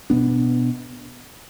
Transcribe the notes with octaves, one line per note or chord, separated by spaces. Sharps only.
B2 B3 D4